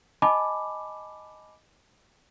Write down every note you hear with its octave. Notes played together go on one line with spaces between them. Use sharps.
D#5 G#5 A5 B5 D6